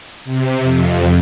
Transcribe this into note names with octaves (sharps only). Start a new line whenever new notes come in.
C3
F2